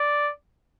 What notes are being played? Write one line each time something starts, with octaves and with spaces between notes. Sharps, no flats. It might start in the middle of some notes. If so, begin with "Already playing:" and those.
Already playing: D5